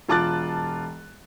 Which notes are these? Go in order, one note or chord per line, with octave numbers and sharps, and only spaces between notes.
E1 F4 A5 D6 F#6 A6